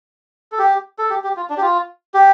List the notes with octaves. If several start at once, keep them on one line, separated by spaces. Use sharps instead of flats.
A4
G4
A4
G4
G4
F4
D4
G4
F4
G4